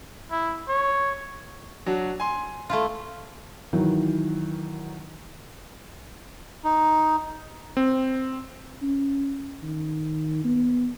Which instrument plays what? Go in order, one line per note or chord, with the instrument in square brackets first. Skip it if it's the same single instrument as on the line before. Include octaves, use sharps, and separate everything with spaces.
[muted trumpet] E4
C#5
[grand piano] F#3 D4 F#4
G#5 C6
[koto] A3 E4 F4
[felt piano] D#3 E3 F#3
[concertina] D#4
[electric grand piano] C4
[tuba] C#4
D#3
B3